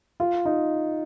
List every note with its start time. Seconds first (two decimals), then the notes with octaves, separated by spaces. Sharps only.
0.20 F4
0.45 D#4